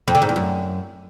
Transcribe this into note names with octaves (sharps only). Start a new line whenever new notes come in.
F2
D3
G#2
E2
F#2